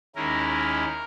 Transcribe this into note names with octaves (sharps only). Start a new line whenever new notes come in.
D#2 D#3 G#3 C#4 E4 A#4